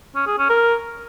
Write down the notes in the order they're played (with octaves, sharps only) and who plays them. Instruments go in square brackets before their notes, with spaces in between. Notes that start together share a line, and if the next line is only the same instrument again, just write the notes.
[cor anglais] C#4
G#4
C#4
A#4